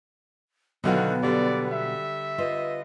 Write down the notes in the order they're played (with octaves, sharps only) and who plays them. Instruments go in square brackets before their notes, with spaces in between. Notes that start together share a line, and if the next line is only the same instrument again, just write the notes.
[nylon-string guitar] B2 F#3 F5 [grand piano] D3 D#3 F#4 [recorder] B3
[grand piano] D3 G3 [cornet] D5
[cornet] E5
[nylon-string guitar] F4 B4 C5 [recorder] D#5